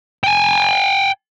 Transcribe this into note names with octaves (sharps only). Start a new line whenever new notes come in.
G5 G#5